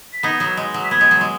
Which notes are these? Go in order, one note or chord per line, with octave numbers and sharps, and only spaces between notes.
B6
B3 D#4 G#6
F#3 B3
G#3
F#3
B6
B3 G#6
G#3
F#3
G#3